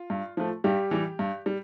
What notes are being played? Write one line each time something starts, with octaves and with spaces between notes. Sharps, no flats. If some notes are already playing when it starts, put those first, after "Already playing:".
Already playing: F4
G2
F3 A3
G2 G3 G4
E3 G3
G2
G3